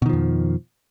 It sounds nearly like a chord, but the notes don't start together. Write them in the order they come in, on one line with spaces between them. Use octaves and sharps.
B2 D#3 F3 F2